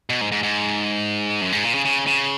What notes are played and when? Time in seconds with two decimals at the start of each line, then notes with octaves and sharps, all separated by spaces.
0.10 B2
0.21 G#2
0.32 G#2
0.43 G#2
1.41 F#2
1.52 G#2
1.63 A#2
1.75 C#3
1.85 C#3
2.07 C#3